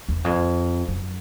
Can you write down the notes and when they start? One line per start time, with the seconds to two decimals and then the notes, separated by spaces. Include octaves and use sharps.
0.09 E2
0.24 F2
0.88 F#2